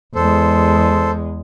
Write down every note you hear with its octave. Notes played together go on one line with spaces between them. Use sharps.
E2 G#3 A4 C5